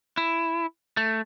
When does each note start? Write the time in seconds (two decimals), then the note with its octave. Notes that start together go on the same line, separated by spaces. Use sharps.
0.17 E4
0.97 A3